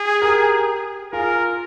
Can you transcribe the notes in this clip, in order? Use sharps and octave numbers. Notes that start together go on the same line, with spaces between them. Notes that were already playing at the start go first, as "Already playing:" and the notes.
Already playing: G#4
G4 A#4
F4 G#4 A#4